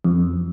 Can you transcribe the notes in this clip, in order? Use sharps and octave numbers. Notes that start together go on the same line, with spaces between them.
F2